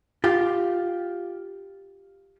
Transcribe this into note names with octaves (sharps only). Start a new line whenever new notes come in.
F4 G4